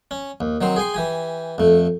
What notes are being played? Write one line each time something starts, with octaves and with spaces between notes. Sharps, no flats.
C#4
D#2
D#3 F#3 C4 C5
G#4 G5 G#5 C6
E3 G4 G#5
F2 A3